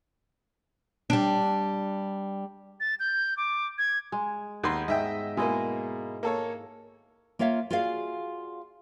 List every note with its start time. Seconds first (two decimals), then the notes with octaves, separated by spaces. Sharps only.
1.10 G3 D4
2.80 A6
3.00 G6
3.37 D6
3.78 G#6
4.12 G#3
4.64 D#2 B3 D#4 B4 C6
4.88 G#2 D#5 E5 G5
5.37 B2 G#3 A#3 E4 D#5
6.23 A#3 A4 C#5
7.39 A#3 F4 C#5 E5 F5
7.71 F4 F#4 G#4 D5 D#5 F5